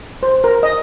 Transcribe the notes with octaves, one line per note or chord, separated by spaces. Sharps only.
C5
A#4
D#5